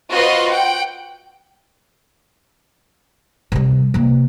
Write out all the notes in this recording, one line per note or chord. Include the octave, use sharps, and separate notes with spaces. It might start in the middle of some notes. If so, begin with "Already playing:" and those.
F4 F#4 B4 C5 D#5 C6
F#5 G5
C3 G3
C3 A#3